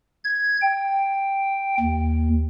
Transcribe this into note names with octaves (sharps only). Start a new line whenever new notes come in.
G#6
G5
D#2